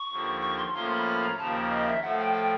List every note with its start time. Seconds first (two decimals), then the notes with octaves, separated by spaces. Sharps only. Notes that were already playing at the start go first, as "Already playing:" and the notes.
Already playing: C#6
0.10 D#2 D3 F3
0.41 C#6
0.57 C6
0.73 A2 F3 A#3 C#4 F4 C6
0.90 B5
1.06 B5
1.22 A#5
1.38 D#2 C#3 F3 A#3 A5
1.70 D#5
1.86 E5
2.02 A2 F3 A3 F#5
2.18 G5
2.34 G5